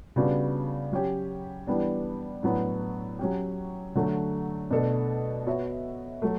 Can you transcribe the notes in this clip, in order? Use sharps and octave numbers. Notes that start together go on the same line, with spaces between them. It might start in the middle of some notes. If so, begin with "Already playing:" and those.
C#3 G3 B3 D4 F#4
F#3 C#4 G4
E3 G3 B3 D4
A2 F#3 B3 D4
F#3 C#4 G4
D3 F#3 A3
B2 A3 D4 A4
B3 F#4 C#5 E5
F#3 A3